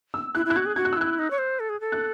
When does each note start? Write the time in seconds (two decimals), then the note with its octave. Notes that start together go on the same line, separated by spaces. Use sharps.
0.14 E6
0.35 E4 F#6
0.46 E4
0.50 F#6
0.56 F#4 G#6
0.66 G#4
0.76 F#4 G#6
0.85 F#6
0.93 E6
0.97 E4 F#6
1.19 D#4
1.31 C#5
1.38 C5
1.60 A4
1.69 G#4
1.81 A4
1.92 F#6